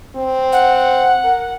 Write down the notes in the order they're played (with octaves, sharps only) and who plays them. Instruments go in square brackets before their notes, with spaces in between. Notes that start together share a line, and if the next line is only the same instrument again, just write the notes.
[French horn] C4
[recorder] F#5
[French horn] A#4